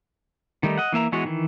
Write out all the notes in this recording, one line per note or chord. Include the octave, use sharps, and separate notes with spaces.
D#3 G3 A3 D#4
D#5 F#5
E3 A#3 E5 A#5
E3 G#3 B3 F#4 C#5
D#3 E3